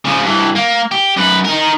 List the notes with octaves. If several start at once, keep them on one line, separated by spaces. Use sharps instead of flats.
C#3 F3
G2 E3
A#3
G4
F#2 B4
D#4 A#4